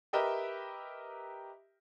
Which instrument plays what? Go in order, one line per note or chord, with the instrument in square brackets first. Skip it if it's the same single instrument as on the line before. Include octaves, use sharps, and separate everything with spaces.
[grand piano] G4 A#4 B4 D#5 E5 G5